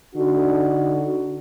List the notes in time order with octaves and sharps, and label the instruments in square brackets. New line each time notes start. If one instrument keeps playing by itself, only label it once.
[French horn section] D3 D4 D#4 F#4